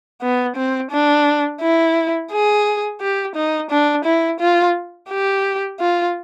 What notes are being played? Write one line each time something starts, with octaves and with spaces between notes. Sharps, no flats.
B3
C4
D4
E4
G#4
G4
D#4
D4
E4
F4
G4
F4